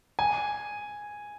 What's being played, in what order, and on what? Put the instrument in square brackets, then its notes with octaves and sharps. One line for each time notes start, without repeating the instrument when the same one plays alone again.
[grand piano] G#5